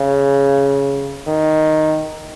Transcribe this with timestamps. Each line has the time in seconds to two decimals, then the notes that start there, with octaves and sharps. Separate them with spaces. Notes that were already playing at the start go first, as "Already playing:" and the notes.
Already playing: C#3
1.27 D#3